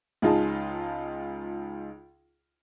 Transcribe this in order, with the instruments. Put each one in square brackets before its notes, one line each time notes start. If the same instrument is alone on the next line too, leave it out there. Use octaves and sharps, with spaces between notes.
[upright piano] C#2 D#4 F4 G#4 A5